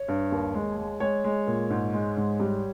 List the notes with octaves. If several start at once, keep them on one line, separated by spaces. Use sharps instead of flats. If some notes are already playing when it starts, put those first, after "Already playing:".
Already playing: C#5
G2
D#2
G#3
G#3
G#3 C#5
G#3
A#2
G#2
G#3
G#2
G3